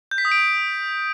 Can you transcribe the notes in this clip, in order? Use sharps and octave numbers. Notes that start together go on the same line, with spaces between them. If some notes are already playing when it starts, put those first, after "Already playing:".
G6
B6
D#6
D7